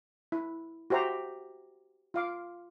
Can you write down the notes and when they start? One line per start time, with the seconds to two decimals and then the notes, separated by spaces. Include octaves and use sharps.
0.32 E4
0.90 F#4 G4 C5 E5 A#5
2.14 F4 F5 D6